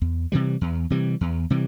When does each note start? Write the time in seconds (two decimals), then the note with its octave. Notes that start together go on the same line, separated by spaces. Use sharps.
0.02 E2
0.32 C3 E3 G3
0.61 E2
0.90 C3 E3 G3
1.21 E2
1.50 C3 E3 G3